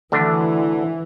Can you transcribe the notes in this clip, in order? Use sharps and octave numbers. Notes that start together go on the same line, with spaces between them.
D2 D3 E3 D4